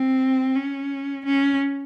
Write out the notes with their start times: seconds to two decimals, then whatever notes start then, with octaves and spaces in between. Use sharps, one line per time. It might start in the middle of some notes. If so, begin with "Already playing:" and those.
Already playing: C4
0.55 C#4
1.25 C#4